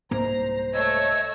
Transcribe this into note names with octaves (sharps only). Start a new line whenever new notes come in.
C2 G#2 A#3 C5 A#5
A3 C#5 D#5 E6 G#6